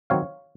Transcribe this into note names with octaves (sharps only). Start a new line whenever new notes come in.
D#3 F#3 C4 C#5 F5